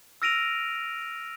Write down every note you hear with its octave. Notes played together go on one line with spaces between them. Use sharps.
E6 F6 A#6 D7 D#7 F7